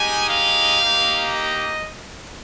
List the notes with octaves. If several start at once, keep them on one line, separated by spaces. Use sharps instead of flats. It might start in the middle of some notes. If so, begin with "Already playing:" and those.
Already playing: G#3 D#4 G4 G#5
F5
A#3 D#4 G4
D#5